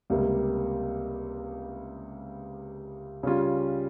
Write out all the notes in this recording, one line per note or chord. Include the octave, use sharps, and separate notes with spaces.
C#2 C3 G3 A#3
C#3 G3 C#4 F4